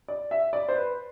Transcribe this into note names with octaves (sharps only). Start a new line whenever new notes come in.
D5
E5
D5
C5
B4